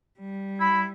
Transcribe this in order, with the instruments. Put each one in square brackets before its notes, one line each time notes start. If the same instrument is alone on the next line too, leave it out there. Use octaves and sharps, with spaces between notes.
[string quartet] G3
[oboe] E4 [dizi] B5